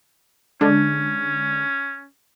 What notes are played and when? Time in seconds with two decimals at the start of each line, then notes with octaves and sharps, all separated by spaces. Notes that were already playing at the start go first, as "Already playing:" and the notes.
0.61 D3 G#3 C#4 D4